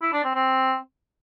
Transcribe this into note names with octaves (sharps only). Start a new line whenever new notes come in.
E4
D4
C4
C4